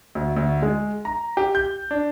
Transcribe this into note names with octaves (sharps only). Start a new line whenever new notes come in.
D2
D2
G#3
A#5
G4
G6
D4